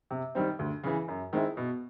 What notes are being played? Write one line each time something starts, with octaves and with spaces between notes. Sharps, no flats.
C3
D#3 G3 C4
D2
C#3 E3
F#2
D#3 G#3 C4 E4
B2